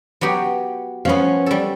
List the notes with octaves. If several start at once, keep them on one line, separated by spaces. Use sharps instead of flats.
F#3 B3 G4
F3 B3 C#4 F5
G3 A4